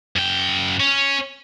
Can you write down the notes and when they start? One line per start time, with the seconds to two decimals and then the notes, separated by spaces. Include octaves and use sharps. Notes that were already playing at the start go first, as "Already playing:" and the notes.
0.16 F#2 G5
0.80 C#4